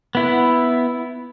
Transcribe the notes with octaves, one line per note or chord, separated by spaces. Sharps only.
B3 E4